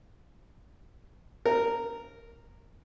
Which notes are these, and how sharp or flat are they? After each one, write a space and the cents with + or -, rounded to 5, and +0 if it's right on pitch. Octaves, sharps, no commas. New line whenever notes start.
A#4 -10